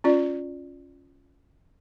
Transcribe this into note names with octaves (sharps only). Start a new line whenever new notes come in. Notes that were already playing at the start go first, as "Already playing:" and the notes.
C#4 F4 D5